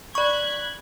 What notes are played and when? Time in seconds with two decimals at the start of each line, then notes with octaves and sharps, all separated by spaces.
0.15 D5 B5 C#6 F#6 G#6